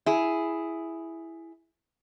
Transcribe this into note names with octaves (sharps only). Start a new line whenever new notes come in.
E4 G#4